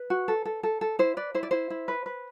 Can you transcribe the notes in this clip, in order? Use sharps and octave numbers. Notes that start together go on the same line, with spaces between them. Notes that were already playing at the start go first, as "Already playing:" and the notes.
Already playing: B4
F#4
A4
A4
A4
A4
E4 C5
B4 D5
E4 C5
D5
E4 C5
E4
B4
B4